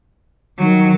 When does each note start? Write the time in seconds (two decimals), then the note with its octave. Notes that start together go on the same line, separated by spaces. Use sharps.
0.58 D#3 F#3